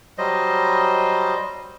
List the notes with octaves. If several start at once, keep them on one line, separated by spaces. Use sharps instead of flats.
F#3 G3 C5 D#5